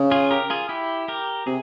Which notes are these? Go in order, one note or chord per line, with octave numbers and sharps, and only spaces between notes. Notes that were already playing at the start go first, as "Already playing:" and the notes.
Already playing: C#3
F4 G#4
G4 A#4
F4 G#4
E4 G4
G4 A#4
C3 G#4